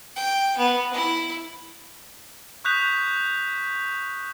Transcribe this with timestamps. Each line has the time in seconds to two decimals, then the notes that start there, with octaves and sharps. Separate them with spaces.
0.16 G5
0.58 B3
0.93 E4
2.65 C#6 D#6 F#6 G6 B6 F7